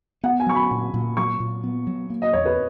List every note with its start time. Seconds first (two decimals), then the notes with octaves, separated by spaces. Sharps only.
0.24 B3 F#5
0.40 G#5
0.47 F#3 C#6
0.55 B5
0.71 A#2
0.94 A#2
1.17 F#3 C#6
1.40 A#2
1.64 B3
1.87 F#3
2.10 A#3
2.22 D#5
2.33 E2 C#5
2.46 B4